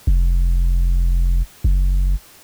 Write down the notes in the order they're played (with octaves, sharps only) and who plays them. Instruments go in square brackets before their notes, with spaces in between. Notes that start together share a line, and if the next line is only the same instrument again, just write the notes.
[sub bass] F1
F#1